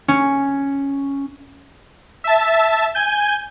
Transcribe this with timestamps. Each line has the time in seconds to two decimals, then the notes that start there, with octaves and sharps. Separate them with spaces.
0.08 C#4
2.24 E5 A5
2.95 G#5 G6